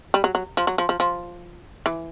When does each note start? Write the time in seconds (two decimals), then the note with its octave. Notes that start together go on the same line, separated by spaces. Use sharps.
0.14 G3
0.24 F#3
0.35 F#3
0.57 F3
0.67 F#3
0.78 F3
0.89 F3
1.00 F3
1.86 E3